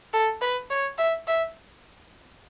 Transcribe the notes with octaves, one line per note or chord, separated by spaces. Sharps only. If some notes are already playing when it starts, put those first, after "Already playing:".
A4
B4
C#5
E5
E5